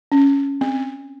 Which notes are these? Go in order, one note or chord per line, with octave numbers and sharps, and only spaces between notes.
C#4
C4